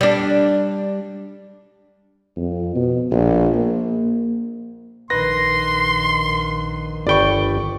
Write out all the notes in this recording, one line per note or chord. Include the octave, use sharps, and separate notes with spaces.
G3 D4
F2
B2
A#1
A#3
A#1 D#3 B4 C6 A#6
G1 D5 G5 B5 C#6